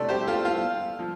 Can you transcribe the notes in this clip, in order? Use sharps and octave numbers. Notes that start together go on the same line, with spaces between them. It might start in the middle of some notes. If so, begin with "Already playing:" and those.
Already playing: C3 A3 D4 A4 D5
G4 C5
F4 A4
F4
F3